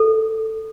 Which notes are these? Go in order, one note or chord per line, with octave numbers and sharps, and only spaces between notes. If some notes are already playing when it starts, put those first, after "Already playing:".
Already playing: A4